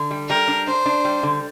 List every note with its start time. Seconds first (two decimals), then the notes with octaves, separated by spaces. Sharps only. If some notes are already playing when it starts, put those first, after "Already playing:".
Already playing: D3
0.11 G3
0.29 G3 A#4
0.48 D4
0.67 D4 C5
0.86 D4
1.05 G3
1.23 D3